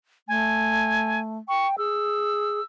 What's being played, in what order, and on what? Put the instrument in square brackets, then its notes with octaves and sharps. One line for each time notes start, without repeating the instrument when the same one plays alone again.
[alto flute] A3 [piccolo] G#5
[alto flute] G5 [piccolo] C#6
[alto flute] G#4 [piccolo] E6